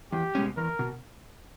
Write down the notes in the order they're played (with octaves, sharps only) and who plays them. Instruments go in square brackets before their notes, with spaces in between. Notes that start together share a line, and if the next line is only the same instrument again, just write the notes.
[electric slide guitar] E2 [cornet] G4
[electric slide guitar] B2 G#3 C#4
[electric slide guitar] E2 [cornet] A#4
[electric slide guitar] B2